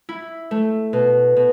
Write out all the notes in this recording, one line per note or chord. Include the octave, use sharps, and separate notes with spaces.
E4
A3
B2
B2